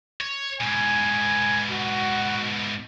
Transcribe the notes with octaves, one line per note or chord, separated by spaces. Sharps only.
C#5
G#2 B2 G#5
F#4